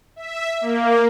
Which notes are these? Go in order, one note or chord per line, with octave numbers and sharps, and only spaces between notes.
E5
A#3